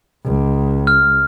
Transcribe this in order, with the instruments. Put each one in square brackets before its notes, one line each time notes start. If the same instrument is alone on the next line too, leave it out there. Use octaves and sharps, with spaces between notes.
[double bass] C#2
[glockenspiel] F6